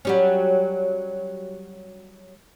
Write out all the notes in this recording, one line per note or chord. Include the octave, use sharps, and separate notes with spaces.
F#3 G3 C#4